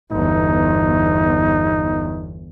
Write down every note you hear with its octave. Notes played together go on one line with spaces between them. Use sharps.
G1 E2 D#4